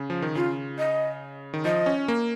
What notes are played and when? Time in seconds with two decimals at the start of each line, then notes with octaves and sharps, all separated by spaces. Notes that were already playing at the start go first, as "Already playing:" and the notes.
Already playing: C#3
0.10 F3
0.22 D#3
0.35 C#3 F4
0.78 D#5
1.54 D#3
1.65 F3 D#5
1.86 C#4
2.08 A#3